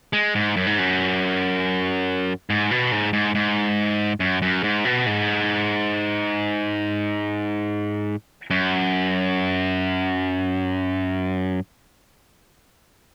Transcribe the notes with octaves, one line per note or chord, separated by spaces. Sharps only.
G#3
G#2
F#2
G#2
F#2
G#2
B2
G#2
G#2
G#2
F#2
F#2
G#2
B2
G#2
F#2